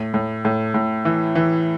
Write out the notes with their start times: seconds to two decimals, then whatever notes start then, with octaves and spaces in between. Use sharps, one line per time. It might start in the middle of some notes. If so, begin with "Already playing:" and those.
Already playing: A2
0.14 A2
0.45 A2
0.74 A2
1.05 E3
1.35 E3